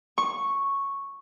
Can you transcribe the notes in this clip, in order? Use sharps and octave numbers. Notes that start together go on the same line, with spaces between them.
C#6